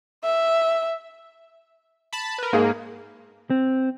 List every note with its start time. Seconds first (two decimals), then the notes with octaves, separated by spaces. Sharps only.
0.24 E5
2.13 A5 B5
2.38 A#4 B4
2.53 G#2 A#3 G#4 F5
3.50 C4